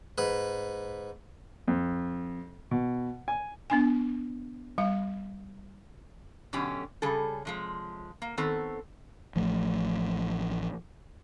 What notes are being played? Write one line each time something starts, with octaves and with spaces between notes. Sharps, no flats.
G#2 B4
F2
B2
G#5
B3 D4 G#5
G3 F5
F#2 B2 D3 C#4 G4
C#3 G3 G#4 A4
C3 F3 G#3
A#3
D#3 B3 C4 A4
A1 F3 A3